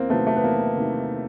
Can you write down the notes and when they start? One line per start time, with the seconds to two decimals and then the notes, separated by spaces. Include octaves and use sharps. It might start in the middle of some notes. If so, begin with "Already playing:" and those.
Already playing: E2 A#3 C4
0.10 C3 D#3 F#3 A3 B3
0.27 A3
0.36 B3
0.44 E2 A#3
0.77 C3 D#3 F#3